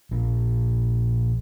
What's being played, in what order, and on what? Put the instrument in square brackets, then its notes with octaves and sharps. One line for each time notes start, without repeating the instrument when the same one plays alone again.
[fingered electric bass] A#1